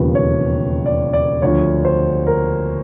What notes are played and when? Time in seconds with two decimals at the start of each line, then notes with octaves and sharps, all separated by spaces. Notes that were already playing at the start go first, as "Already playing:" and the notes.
Already playing: E1 D#2 C#3 F3 B4
0.15 C#5
0.86 D5
1.13 D5
1.42 D2 D3 F3 C#5
1.85 C5
2.27 A#4